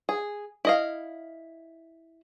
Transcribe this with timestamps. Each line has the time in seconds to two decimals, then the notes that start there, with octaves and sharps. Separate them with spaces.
0.09 G#4
0.65 E4 D#5 F5